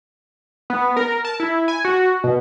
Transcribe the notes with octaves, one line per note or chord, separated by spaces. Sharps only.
B3
A#4
A5
E4
G#5
F#4
B2